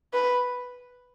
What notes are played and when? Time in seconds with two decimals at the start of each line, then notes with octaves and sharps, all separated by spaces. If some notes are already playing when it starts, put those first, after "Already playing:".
0.14 B4